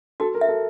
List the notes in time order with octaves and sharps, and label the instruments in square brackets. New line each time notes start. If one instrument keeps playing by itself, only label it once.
[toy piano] F#4 [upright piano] A4
[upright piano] A#4
[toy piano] E5
[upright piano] A4